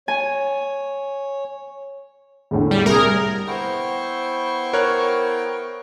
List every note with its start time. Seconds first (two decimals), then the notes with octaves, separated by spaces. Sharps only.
0.08 C#5 G#5
2.51 E2 A2 D3
2.71 G3
2.86 C2 G#4 A#4
3.47 B3 E4 C5 G5 C#6
4.73 A#4 C#5 F#6